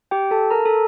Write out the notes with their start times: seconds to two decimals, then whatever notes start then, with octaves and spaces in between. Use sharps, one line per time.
0.11 G4 G5
0.31 A4 A5
0.51 A#4 A#5
0.66 A4 A5